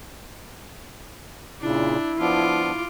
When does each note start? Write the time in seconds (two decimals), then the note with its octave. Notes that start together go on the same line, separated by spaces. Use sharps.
1.61 A#2 C#3 D4 E4
2.19 F3 B3 D4 F4 D6